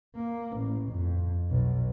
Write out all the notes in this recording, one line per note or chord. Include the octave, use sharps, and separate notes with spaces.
A#3
A1
F2
B1